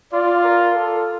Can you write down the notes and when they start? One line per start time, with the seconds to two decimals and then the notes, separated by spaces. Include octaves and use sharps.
0.13 F4 D5
0.44 A#4
0.75 A4